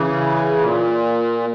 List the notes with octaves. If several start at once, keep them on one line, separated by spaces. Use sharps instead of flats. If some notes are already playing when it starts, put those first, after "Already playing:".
Already playing: C#3 E3
A#2